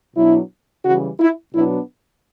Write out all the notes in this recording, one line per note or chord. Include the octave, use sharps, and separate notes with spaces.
B2 F#3 B3 D4 E4
C#3 E3 G3 F#4
E4
B2 F#3 B3 D4 E4